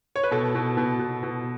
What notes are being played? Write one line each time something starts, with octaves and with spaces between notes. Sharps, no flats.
C#5
B4
B2 A4
B2
B2
B2
B2